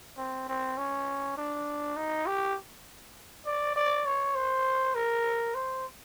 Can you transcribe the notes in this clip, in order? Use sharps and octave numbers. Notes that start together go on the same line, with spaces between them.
C4
C4
C#4
D4
D#4
G4
D5
D5
C#5
C5
A#4
C5